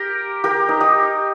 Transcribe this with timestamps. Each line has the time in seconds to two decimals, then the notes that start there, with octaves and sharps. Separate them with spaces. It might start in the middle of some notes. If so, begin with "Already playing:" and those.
Already playing: G4 A#4
0.44 G4 A#4
0.69 D#4
0.80 D#4 G4